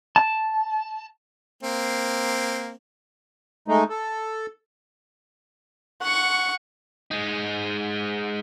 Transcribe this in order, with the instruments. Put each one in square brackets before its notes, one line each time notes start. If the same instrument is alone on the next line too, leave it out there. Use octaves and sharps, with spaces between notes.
[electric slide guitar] A5
[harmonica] A#3 C4
[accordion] G#3 A3 D#4
A4
[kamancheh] F#5 C#6
[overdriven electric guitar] G#3 D#4